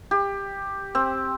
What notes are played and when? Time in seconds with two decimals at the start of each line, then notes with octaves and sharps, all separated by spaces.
0.11 G4
0.95 C4